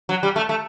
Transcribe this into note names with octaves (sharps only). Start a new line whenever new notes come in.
F#3
G3
A3
A3